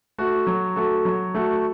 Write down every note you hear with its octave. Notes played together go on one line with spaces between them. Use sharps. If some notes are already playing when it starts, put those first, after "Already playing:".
A3 F#4 A4
F#3
A3 F#4 A4
F#3
A3 F#4 A4